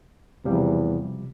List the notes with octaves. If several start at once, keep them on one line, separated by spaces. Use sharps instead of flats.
E2 C3 F3 G3